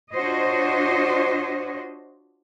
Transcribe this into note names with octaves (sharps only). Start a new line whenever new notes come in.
D4 F4 F#4 C5 C#5 D#5